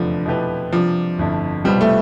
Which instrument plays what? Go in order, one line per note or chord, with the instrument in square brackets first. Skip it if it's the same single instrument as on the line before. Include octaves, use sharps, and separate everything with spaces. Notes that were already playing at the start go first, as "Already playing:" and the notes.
Already playing: [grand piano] F1 E2 D3 A3 D4 [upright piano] F3
[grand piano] B2 A3 E4 G4 B4
[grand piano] C3 G3 D4 [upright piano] F3
[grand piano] G1 F2 D3 A3 E4
[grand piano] C2 B2 B3 F4 C5 [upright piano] G3
[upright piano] A3